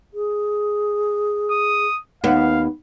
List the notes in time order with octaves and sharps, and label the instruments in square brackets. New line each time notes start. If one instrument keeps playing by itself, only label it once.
[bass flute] G#4
[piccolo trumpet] D#6
[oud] D#2 B3 [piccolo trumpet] F5